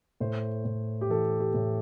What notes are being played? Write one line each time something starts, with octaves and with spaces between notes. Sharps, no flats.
A2 C5
A2
G4
E3 A4
G4
A2